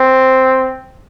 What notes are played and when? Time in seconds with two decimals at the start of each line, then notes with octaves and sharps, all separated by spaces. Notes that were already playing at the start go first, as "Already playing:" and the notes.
Already playing: C4